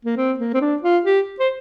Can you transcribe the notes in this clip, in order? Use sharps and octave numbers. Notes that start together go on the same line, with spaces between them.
A#3
C4
A#3
C4
D4
F4
G4
C5